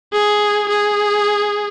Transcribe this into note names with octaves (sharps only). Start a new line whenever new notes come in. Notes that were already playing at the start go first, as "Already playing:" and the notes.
G#4
G#4